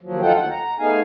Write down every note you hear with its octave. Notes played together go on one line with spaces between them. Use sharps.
D#2 F3 F#3
D2 D#4 F4 A4 F#5 G5
D#2 F#5
A#5
A3 B3 D#4 G#4 F5 G#5